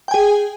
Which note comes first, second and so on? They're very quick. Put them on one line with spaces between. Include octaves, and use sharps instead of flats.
G5 G#5 G#4